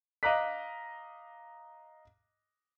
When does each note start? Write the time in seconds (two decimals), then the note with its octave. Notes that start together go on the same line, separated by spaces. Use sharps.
0.23 D#5 F5 A#5 D6 F#6 B6